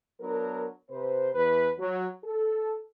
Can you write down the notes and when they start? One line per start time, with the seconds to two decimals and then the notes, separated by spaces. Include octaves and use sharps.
0.21 F#3 B3 D4 A#4
0.90 C3 B4 C5
1.34 E2 B4
1.79 F#3
2.24 A4